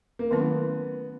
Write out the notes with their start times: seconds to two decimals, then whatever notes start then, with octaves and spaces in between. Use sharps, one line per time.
0.19 A#3
0.31 D#3 F#3 A3 B3 C#4 E4